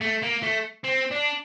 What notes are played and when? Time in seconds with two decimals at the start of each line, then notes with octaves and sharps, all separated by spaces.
0.02 A3
0.23 A#3
0.43 A3
0.84 C4
1.11 D4